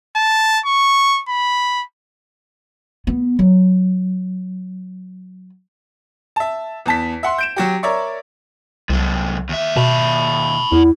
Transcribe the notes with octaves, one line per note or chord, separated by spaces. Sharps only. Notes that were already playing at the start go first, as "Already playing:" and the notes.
A5
C#6
B5
B3
F#3
E5 A5
E2 A5 B6
E5 F#5 C6
G6 D7 E7
F#3 F#4 G4
A#4 C#5 D5 E5 C#6
C2 C3 F#3
D#2 E5
B2 A5 B5
E2 E4